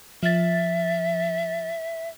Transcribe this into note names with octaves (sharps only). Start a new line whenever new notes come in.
F3 E5 A6